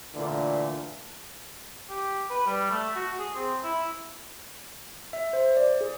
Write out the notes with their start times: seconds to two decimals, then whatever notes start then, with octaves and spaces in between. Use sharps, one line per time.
0.15 A#2 D3 E3 A3
1.89 G4
2.30 B4
2.46 G3
2.71 A3
2.96 F#4
3.19 G#4
3.35 C4
3.64 E4
5.13 E5
5.33 C5
5.57 D5
5.81 G#4